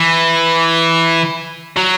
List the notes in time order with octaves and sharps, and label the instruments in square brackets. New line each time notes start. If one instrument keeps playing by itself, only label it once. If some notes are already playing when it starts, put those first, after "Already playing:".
Already playing: [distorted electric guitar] E3
F#3